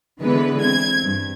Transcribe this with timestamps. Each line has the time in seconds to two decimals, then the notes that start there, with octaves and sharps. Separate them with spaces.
0.21 D3 E3 G#3 B3 B4
0.61 C4 G#6
1.04 G2